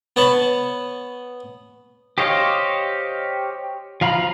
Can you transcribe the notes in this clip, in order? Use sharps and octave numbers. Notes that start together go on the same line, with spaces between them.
B3 C#5 A5 B5
G4 C5 C#5 D#5 F5
F3 F5 A#5 B5